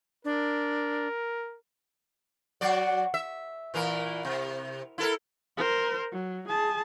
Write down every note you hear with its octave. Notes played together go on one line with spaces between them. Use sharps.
D4 A#4
F#3 F#4 D5
E5
A#2 E3 A#4
C3
E4 A4 A#4
A#4 C5
F#3
G#4 A5